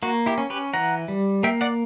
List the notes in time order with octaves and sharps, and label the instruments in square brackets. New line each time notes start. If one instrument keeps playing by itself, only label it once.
[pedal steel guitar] A#3 F#4
E4 G4
C#4
G4 B4
E3 F#5 A#5
G3
A#3 E5 G5
D5 F#5